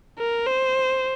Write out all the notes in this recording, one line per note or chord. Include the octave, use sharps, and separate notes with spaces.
A#4
C5